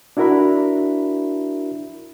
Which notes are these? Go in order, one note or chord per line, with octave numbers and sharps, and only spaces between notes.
D4 E4 F#4 A#4 E5 B5